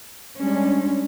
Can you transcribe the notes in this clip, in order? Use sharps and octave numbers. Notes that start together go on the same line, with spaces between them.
G3 G#3 C#4 D4